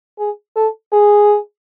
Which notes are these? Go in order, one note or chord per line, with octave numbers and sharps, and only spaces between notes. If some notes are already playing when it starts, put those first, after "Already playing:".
G#4
A4
G#4